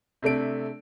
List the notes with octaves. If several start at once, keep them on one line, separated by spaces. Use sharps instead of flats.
C3 A3 D4 D7